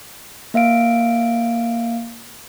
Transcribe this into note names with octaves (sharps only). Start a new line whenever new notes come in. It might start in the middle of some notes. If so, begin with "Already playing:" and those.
A#3 E5 F5 D7